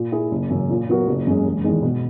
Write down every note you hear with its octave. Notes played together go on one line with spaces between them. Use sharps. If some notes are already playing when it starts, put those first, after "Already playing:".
Already playing: A#2
A#3 E4 G#4
F#1
F#2 C#3
A#2
F#3 B3 F#4 A#4
F#1
F#2 C#3 G#3
E1
E2 D#3 G#3
B2